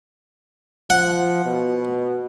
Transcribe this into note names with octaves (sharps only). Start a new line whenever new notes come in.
F3 F#5
B2